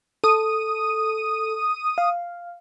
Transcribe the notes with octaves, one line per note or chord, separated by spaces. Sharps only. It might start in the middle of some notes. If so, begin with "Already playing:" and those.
A4 D#6 D#7
F5